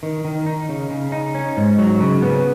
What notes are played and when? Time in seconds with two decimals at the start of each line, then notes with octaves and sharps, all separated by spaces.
0.03 D#3
0.25 D#3
0.46 D#4
0.69 C#3
0.91 C#3
1.12 D#4
1.35 C#4
1.57 G#2
1.78 F#3
2.01 C#3
2.22 B3